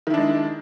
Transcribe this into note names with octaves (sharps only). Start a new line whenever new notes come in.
D#3 G#3 D4 E4